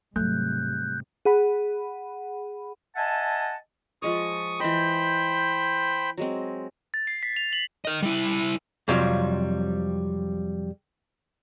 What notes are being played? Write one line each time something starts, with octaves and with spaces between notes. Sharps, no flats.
G#2 C3 F#3 G3 A3 F#6 G6
G#4 F#5 B5
D#5 E5 F#5 G#5 A5
F3 G#3 C#5 C#6 D#6
E3 C5 D#5 G5 B5
F#3 G#3 C4
A6
C7
B6
F7
F#7
A#4 D#5
G3 E4
F2 C3 F#3 G3 F4